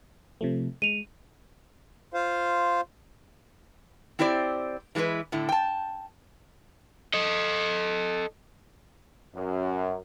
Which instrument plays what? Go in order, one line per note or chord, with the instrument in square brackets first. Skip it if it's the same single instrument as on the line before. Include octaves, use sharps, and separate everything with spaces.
[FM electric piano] C3 F3 A3
[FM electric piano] G#3 [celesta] D#7 F7
[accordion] F4 C5 F5
[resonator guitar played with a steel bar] C4 E4 G4 C5 D5
E3 G#3 A#3 E4 B4
A2 D3 E4
G5 A5
[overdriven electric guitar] A4 D#5
[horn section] F#2